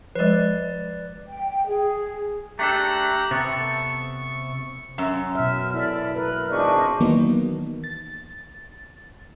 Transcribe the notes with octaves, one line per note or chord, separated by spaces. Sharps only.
F3 G#3 B4 D5
G5
G#4
A3 D4 G4 A4 A#5 F#6
C3 B3 A4 C#6
F#2
B2 E5 F6
E4 A4 D5 E5
A#4 B4 F6
G#1 E2 D4 C5 D#5 C#6
D#3 E3 F#3 A#3 B3 D#4
A6